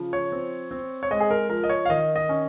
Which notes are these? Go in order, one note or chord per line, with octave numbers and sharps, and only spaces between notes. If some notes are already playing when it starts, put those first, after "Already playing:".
Already playing: C#3 F3
C#5
C4
C4
C#5
G#3 D#5
G#4
A#4
F3 A#4
D#5
C#5
F5
D#3 D#5
D#5
C#4